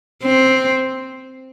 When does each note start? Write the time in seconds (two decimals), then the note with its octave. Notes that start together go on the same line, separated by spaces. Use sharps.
0.24 C4